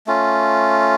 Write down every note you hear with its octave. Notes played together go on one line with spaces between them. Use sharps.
A3 C#4 F4